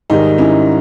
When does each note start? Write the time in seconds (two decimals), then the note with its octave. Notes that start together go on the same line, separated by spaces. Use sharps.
0.10 G#2 D#3 G3 D#4
0.38 C#4 E4